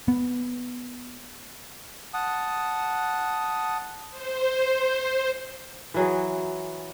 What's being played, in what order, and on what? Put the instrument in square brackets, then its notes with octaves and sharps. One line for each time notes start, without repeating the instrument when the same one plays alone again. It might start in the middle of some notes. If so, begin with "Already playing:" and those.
[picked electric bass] B3
[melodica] F#5 A5 D#6
[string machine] C5
[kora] E3 F#3 G#4